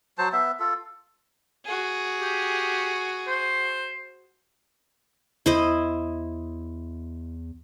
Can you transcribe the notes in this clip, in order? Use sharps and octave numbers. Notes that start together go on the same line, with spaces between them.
F#3 C5 A5
B3 E5
F4 A4
F#4 G#4
G4
C5
E2 E4 C5 D#5